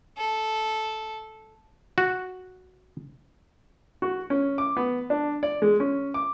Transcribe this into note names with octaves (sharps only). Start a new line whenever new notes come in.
A4
F#4
F#4
C#4
D6
B3
D4
D5
G#3
C#4
D6